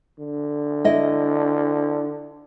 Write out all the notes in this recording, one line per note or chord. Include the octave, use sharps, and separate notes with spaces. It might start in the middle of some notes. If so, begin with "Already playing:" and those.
D3
E4 D#5